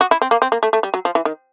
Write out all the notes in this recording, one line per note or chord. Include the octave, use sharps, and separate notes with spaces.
F#4
E4
C4
A#3
C4
A#3
A3
A3
G3
F#3
F3
E3
D#3